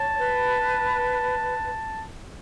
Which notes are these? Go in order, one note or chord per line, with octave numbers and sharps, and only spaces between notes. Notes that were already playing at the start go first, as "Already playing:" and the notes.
Already playing: C#5 A5
B4